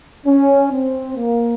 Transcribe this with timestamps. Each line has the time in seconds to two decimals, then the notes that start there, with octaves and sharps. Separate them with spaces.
0.26 C#4
0.71 C4
1.16 A#3